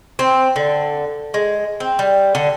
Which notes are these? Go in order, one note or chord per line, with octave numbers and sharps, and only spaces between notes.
C4
D3
G#3
C4
G3
D3